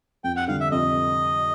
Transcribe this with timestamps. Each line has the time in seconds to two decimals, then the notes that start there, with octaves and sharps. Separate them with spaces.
0.24 F2 G5
0.36 F#5
0.48 D3 G3 F5
0.60 E5
0.71 F2 D#5